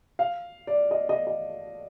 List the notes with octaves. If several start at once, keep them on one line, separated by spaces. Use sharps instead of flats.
F5
D5
D#5
D#5
D#5